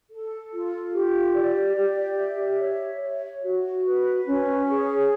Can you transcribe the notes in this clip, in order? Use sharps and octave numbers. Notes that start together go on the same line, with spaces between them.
A4
F4
G4
D5
G4
E5
C#5
C#5
F#4
B4
C#4
G#4